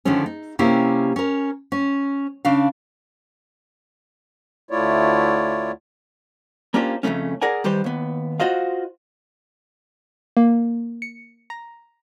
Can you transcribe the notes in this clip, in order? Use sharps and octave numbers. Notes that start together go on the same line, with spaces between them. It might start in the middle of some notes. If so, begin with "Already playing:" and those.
D3 D#3 F3 G#3 A3 C#4
D#4
C3 A#3 C#4 E4 G4 A#4
C#4 A#4
C#4
C#3 D4 F5
D2 A3 E4 F4 C#5 D5
A#3 C#4 D4 F4 G4 C5
F2 A2 C#3 A3 C#4
G#4 A#4 D5 F#5 G#5
D#3 G3 G4 B4 C5
D#2 B3
F4 F#4 C5 D#5 F5
A#3
C#7
A#5